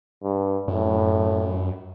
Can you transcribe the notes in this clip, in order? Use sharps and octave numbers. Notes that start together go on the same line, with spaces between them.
G2
F#2 A2